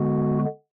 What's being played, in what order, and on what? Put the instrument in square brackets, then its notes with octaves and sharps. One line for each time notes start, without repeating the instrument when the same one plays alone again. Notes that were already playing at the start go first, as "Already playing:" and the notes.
Already playing: [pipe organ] D3 G#3 B3 F#4